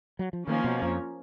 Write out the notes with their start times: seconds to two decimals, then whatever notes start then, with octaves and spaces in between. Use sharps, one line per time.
0.19 F#3
0.33 F3
0.47 D#3 F3 A#3 C#4
0.64 B2
0.82 F2